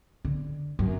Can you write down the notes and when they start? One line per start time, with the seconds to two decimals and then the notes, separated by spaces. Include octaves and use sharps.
0.25 D3
0.79 F#2